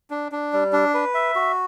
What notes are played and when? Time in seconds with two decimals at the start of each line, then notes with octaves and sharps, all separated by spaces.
0.10 D4
0.32 D4
0.53 G3
0.73 D4
0.94 B4
1.14 E5
1.35 F#4